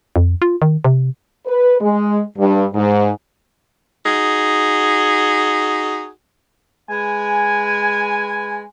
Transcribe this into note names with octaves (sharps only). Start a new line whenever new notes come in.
F2
F4
D#3
C3
B4
G#3
G2
G#2
D#4 F#4 G#4
G#3 B4 G#5